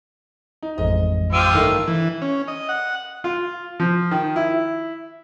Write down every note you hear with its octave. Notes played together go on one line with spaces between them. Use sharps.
D#4
A1 F2 G#2 D#5
F3 F4 G4 E6 D7 D#7
G2 D#3 A3
E3
C#4
D#5
F#5
F4
F3
D#3
E4